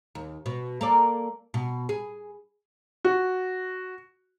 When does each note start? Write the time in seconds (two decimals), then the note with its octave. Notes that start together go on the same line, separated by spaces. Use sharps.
0.15 D#2
0.46 B2
0.81 A#3 A4 D5
1.54 B2
1.89 G#4
3.05 F#4